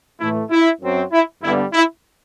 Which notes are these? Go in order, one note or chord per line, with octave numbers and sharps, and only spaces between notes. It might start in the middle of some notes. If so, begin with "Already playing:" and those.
A2 E3 A3 E4
E4
F#2 F#3 C4
E4
G2 D3 G3 B3 E4
E4